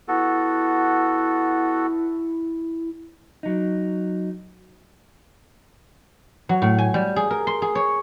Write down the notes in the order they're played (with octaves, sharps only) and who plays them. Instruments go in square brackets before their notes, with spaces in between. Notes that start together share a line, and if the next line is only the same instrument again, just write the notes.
[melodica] B3 F#4 A4 [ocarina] E4
[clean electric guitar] F#3 D#4
[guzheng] F#3
A2
G#5
G3
G#4
A#4
C6
G#4
C#5